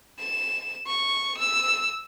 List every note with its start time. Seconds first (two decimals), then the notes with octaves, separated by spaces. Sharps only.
0.19 E7
0.87 C#6
1.38 E6